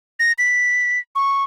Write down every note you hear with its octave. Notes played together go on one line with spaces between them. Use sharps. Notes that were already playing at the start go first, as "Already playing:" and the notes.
A#6
B6
C#6